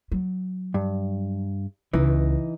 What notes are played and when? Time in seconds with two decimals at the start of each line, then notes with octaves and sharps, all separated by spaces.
0.12 F#3
0.74 G2
1.93 C#2 E3 D#4